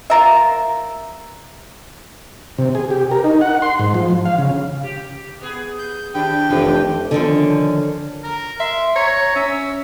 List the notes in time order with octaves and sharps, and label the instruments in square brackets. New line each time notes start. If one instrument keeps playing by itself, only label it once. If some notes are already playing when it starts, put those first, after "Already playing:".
[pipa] F4 A#4 E5
[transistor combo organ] C3
G#4
G4
A#4
D#4
F#5
C6
G#2
F3
F5
C#3
[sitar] G4
B3 G#4
[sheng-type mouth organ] G6
[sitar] D#3 [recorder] D4 [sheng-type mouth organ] G4 G5
[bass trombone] F1 [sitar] G#2 D#3 E3
[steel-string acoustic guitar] D3 D#3 F3 C#4
[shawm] A#4
[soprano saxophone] E5 [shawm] C6
[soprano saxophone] C#5 [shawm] A#5
[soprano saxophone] C#4 [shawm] E5